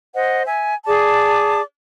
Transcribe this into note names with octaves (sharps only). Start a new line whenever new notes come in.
C5 D#5 F#5
E5 G#5
G#4 D5 A5 D6